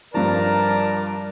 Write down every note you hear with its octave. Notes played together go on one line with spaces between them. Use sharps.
G2 F3 A#4 D5 A5 A#5